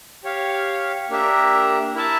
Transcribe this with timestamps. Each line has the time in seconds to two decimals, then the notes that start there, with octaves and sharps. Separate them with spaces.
0.24 G4 C#5 F5
1.10 A#3 D4 G4 A#4 E5
1.95 E4 A#4 E5 A5